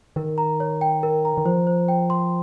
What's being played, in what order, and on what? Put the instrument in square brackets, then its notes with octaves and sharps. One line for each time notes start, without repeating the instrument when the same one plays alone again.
[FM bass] D#3 [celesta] A#4
[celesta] A#5
C#5
G5
A#4
A#5
[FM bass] D#3
[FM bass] F3 [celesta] C5
[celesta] C5
G5
C6